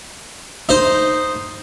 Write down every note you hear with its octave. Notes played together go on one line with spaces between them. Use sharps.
D#4 C5